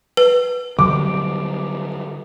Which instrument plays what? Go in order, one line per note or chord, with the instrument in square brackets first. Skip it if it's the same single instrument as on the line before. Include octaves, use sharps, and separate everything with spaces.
[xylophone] B4
[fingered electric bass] D3 F#3 G3 [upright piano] D6